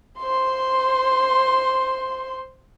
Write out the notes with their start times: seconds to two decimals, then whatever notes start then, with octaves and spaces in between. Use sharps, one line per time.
0.19 C5 C6